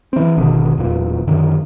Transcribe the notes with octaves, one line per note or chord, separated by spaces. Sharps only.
E3 C4
G#1 B2 D3 D#3
D1 E2 A#2
F#2 D3 D#3